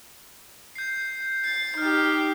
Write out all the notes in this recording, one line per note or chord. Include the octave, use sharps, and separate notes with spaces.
G6 C7
A6 C7
D#4 G4 F6